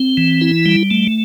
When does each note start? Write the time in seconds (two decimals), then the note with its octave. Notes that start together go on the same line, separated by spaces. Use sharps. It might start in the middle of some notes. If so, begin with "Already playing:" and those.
Already playing: C4
0.17 E3
0.41 E4
0.66 G3
0.91 A3